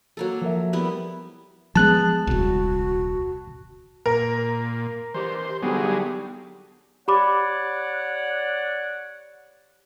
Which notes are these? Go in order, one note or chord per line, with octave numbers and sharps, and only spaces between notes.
F#3 A#3 A4
F3 A#4 E5
G3 B3 E4
F3 G#3 B3 G#4 A5 F#6
D#1 C2 F#4
A#2 A#4
E3 G4 C5
D3 F#3 G3 B3 D#4 G4 G#4
G4 C#5 D5 F#5 B5 D6